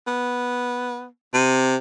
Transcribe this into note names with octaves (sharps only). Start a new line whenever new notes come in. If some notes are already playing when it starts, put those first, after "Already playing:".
B3
C3